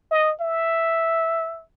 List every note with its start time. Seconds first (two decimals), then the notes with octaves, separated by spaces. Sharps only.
0.11 D#5
0.41 E5